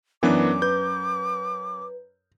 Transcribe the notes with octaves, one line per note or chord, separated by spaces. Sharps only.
F#2 E3 B3 D4 A#4 D5 D6
B4 G6